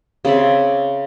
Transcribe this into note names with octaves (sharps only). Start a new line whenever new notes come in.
C#3 C4 D5 E5